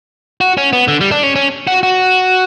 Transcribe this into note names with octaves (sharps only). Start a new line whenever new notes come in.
F#4
C#4
B3
D3
G3
D4
C#4
C#4
F#4
F#4